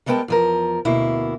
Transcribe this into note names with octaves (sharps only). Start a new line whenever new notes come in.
G3 G#3 B3 A#4 G5 A5
E2 F3 A#4
D2 B2 A#3 E4